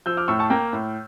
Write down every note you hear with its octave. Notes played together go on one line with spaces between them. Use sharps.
F3 E6 G6
D6 F6
A2 C#6 E6
A5 C#6
A#3 G5 A#5
A2